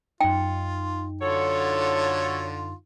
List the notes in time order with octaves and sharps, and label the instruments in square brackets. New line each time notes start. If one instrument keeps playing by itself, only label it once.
[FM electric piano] F#2 D#4 [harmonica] F4 [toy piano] G5
[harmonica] D3 F4 [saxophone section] F#3 A4 C#5